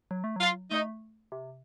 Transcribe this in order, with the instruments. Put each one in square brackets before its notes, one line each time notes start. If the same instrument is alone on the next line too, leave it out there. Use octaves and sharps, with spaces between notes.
[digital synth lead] F#3
A3
[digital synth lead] F#3 [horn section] F4
[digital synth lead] A3 [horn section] D#4
[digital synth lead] C3